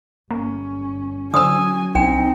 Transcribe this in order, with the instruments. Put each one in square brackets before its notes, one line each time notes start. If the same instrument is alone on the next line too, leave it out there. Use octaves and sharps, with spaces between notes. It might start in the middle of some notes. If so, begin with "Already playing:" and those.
[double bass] G1 C#4 [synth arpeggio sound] A#3
[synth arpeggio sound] D3 C5 E6 [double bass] F#3 C#4 [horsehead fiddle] G#5 [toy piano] D#6
[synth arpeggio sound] C2 [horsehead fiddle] C4 D#4 [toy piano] D4 G5